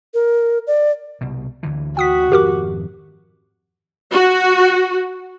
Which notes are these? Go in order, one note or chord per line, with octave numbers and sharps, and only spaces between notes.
A#4
D5
C2 B2
D2 D3 E3
F#4 G5 D#6 B6
G#1 F2 G4 A#4 D6
F#4